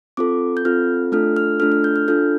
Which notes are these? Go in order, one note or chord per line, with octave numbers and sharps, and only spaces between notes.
C4 F4 A4 D6
G6
C4 F4 A4 F6
A3 D4 F4 A4 F6
F6
A3 D4 F4 A4 F6
F6
G6
F6
D4 F4 A4 G6